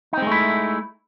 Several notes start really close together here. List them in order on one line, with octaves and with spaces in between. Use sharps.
D#4 C4 G#3 A3 E4